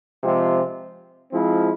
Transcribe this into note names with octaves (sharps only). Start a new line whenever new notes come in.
C3 F3 G#3 C4 F4
F3 G#3 C4 E4